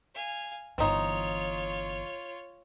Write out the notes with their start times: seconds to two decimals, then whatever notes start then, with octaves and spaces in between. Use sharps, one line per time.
0.14 F5 G#5
0.78 G1 E3 C4 D#4 F4 C#5